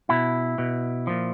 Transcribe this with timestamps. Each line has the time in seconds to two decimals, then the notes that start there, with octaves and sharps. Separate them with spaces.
0.09 B2 E4
0.58 B2
1.07 A#2 F3